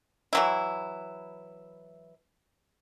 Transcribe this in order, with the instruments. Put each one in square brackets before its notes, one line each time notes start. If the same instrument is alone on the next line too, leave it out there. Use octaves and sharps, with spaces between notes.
[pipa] E3 F#3 E4